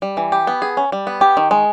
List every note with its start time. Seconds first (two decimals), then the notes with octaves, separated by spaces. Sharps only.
0.02 G3
0.17 E3
0.32 G4
0.47 B3
0.62 G#4
0.77 C#4
0.92 G3
1.07 B3
1.21 G4
1.37 D#3
1.51 G#3